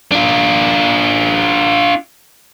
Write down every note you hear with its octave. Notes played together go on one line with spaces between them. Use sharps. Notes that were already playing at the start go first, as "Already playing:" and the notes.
D4 F4